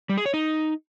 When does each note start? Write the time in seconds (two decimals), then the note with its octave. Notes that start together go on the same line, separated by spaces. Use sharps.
0.09 G3
0.18 G#4
0.26 C#5
0.34 D#4